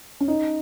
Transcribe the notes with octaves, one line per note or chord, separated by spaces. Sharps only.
C#4
D#4